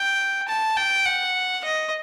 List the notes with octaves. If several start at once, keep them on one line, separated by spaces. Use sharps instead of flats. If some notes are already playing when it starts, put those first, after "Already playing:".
Already playing: G5
A5
G5
F#5
D#5